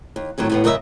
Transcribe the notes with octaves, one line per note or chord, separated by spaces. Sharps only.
D#2
F2 A2 D#3 F#3
D#2 A2 B3
F#2 C#3 A#4 D#5 E5